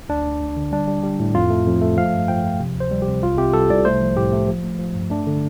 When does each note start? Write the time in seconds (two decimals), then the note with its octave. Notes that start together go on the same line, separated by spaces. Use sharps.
0.09 D2 D4
0.26 D2
0.41 D2
0.56 D3
0.72 G3 D4
0.87 G3
1.03 G3
1.20 A2
1.35 F2 F4
1.50 A3
1.66 F2
1.81 A3
1.97 F3 F5
2.13 G2
2.28 F3 G5
2.44 F3
2.60 C3
2.75 D2 C5
2.91 G3
3.02 G4
3.08 C3
3.23 C2 F4
3.38 C3 G4
3.53 C2 A4
3.70 C2 D5
3.85 A3 C5
4.01 F3
4.16 A2 G4
4.33 A3
4.48 F3
4.63 A3
4.79 F3
4.95 G2
5.10 A3 D4
5.27 D3